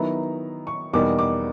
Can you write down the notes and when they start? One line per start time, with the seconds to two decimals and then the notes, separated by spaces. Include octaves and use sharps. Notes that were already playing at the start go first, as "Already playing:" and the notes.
Already playing: D#3 F#3 B3 E4 A#5
0.67 C#6
0.93 E2 B2 G3 A#3 D#4 D6
1.19 D6